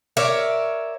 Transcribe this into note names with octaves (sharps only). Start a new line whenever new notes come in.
A#4 C#5 D5 E5